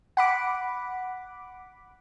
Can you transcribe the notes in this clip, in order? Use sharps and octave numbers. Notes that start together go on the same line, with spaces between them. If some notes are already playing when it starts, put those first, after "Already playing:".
F#5 B5 D6